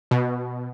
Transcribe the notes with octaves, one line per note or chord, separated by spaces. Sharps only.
B2